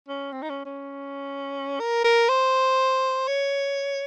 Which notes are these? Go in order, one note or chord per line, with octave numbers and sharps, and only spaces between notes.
C#4
C4
D#4
C#4
C#4
A#4
A#4
C5
C#5